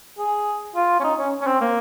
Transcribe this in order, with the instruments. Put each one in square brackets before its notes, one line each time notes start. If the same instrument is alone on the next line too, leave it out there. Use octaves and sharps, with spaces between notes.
[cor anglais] G#4
F4
C#4
D#4
C#4
C#4
C4
A#3